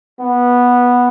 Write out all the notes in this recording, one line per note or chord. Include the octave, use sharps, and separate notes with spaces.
B3